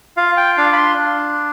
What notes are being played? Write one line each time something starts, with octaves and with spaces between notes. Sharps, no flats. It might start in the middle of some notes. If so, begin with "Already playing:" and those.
F4 F5
G5
D4 F5
B5
C6
D4